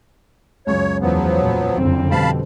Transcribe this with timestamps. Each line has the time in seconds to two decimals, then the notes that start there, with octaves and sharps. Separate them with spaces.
0.67 C#2 F#2 C#5
1.01 E2 F3 F#3 B3
1.42 A#2
1.78 F#1 F2 D3 C4
2.11 B2 G3 A4 F5 A5 B5